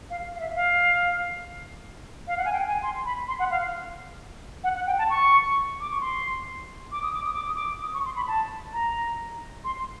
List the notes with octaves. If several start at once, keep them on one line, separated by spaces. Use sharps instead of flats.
F5
F5
E5
F5
F5
F#5
G#5
G5
G#5
C6
B5
C6
F#5
F5
F#5
F#5
G5
A5
C#6
D6
C#6
C6
D6
D#6
D6
D#6
D6
D#6
D6
D#6
C#6
C6
B5
A5
A#5
C6